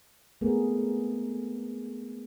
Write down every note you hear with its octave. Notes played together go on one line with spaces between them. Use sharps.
G#3 A3 B3 C4 G#4 A#4